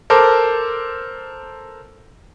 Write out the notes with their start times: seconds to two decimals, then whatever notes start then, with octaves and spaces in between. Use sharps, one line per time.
0.10 A4 A#4 C5 A5 D6